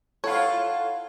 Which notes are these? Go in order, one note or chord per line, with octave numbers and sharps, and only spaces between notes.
E4 F4 A4 C#5 F#5